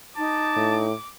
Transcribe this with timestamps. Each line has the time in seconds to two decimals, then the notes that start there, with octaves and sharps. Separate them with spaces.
0.18 D#4 A5 D6
0.56 A2